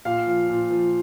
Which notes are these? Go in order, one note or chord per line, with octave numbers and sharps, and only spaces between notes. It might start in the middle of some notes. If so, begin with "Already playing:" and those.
A#2 F5
F3
A#2
F3